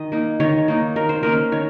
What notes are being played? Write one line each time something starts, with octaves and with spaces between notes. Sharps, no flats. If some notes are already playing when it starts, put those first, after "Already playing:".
Already playing: D#3 D#5
A#3 D#4
D#3 C#5
A#3 D#4
D#3 A#4
C5
A#3 C#4 A#4
D#3 C#5